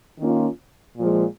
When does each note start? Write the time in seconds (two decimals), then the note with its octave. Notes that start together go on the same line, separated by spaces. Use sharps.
0.19 D#3 A#3 C#4 F4
0.98 A#2 F3 G#3